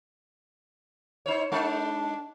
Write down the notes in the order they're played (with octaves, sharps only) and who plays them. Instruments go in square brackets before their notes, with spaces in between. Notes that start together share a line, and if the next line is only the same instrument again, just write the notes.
[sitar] D#4 C5 C#5
[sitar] G#3 D#4 [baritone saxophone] D4